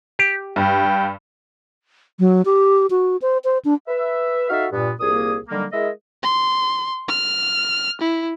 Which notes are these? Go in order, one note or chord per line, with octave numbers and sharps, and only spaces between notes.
G4
G2 G5
F#3
G4
F#4
C5
C5
D4
B4 E5
D#4 F#4 A4 E5 F5
G2 A#2 B3
C2 A#2 A#3 G#4 D#6
D3 D#3 F#3 G3 A#3
G#3 E4 G#4 A#4 D#5 E5
C6
F6
E4